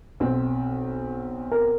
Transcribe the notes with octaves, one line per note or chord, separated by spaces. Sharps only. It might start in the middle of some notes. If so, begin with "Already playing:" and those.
B1 C4
A#4